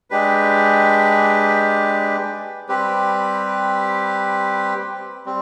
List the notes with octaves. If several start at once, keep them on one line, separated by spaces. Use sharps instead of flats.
G#3 D4 G4 B4
G3 C4 G4 B4
G3 C4